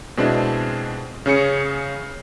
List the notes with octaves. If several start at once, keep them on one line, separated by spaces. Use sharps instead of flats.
B2 G#3 C4 D4 E4
C#3 C#4 G#4 C#7